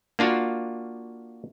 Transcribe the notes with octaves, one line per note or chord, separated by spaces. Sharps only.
A#3 D4 F4 F#4